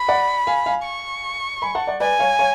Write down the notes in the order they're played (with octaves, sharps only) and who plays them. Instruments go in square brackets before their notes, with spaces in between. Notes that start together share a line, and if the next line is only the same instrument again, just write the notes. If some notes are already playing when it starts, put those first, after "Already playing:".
Already playing: [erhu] B5
[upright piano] D5 F#5
F5 G#5
F5 G#5
[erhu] C#6
[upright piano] G#5 B5
F#5 A5
D5 F#5
[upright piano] B4 D5 [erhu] G#5
[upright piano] C#5 F5
C#5 F5